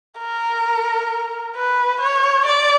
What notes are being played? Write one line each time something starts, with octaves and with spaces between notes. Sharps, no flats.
A#4
B4
C#5
D5